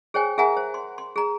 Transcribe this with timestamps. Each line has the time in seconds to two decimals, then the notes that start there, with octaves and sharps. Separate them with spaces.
0.14 G#4 C5 C#5 G5 G#5
0.38 G#4 A#4 E5 F#5 G#5 A#5
0.57 C5
0.74 C6
0.98 C6
1.16 G#4 A#5